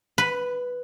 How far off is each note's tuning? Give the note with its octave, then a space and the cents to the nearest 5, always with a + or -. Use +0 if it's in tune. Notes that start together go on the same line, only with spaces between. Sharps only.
B4 +0 B5 +35